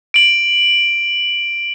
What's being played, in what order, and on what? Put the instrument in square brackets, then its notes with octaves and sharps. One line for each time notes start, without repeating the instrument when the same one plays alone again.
[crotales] D7 F#7